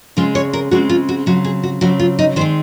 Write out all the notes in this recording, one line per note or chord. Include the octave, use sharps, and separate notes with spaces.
C#3 G#3 C4 F4
C#5
A#4
C#3 G#3 C4 F#4
F4
F#4
C#3 F#3 C4 F#4
G#4
F#4
C#3 F#3 C4 F#4
F4
D#4
D#3 G#3 C4 C5